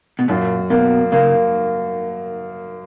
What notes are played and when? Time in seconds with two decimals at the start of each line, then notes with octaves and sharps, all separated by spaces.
0.19 B2
0.28 F#2 A#2
0.70 B2 A#3
1.12 C#3 A#3